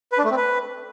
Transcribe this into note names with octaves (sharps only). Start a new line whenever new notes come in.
B4
D4
A3
C4
B4